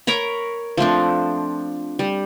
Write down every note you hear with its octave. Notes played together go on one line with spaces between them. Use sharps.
A#4 C#5 A#5 B5
F3 A3 C4 D4
G3